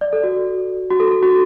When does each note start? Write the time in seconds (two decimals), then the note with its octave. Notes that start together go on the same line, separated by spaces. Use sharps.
0.01 D5
0.13 A4
0.23 F#4
0.90 F#4
1.00 A4
1.11 A4
1.23 F#4